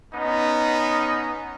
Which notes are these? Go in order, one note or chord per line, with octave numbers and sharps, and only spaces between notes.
B3 C#4 D#4